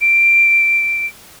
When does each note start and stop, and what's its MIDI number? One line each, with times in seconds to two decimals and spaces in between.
0.01 1.06 98